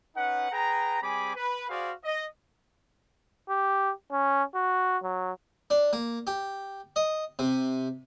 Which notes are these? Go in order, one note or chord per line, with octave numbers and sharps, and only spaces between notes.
C#4 D#4 B4 F#5
G#4 B4 G5 A#5
G3 C4 G#4 G#5 B5 D6
B4
F#4 G#4 C5 D5 F5
D#5
G4
C#4
F#4
F#3
D4
A#3
G4
D#5
C3